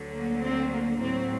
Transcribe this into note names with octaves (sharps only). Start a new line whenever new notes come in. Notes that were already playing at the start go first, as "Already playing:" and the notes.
Already playing: D2 D3 F#3
A#3
C4
A#3
A2 F#3 C4